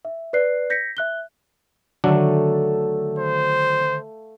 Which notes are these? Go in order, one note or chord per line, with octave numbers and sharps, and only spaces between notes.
E5
B4 D5 F#6 C7
G6 A#6 B6 C#7
E5 F#6 G7
D3 D#3 F#3 A3 D4 A4 F5
C5